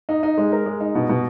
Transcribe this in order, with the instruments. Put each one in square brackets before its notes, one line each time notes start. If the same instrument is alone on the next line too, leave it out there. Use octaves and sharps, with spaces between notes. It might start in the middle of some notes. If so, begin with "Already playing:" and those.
[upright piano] D#4
D#4
G#3
A#4
G#3
D#4
B2
B2